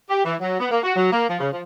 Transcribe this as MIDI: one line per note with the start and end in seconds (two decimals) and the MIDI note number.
0.10 0.24 67
0.25 0.34 52
0.41 0.58 54
0.59 0.68 59
0.71 0.81 58
0.83 0.94 66
0.96 1.09 54
1.12 1.27 58
1.28 1.37 53
1.40 1.49 49
1.52 1.61 53